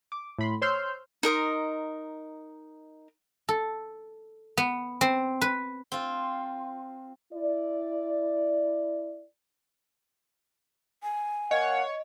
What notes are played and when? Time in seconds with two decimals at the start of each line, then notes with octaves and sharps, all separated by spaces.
0.12 D6
0.38 A2 B5 C6
0.62 C5 C#5 C6 E6 F6 G6
1.23 D#4 A#4 D#5 C6
3.49 A4
4.57 B3
5.01 C4
5.41 B4
5.92 C4 F4
7.32 E4 D5
11.03 G#5
11.51 A#3 C#5 D#5 F5 F#5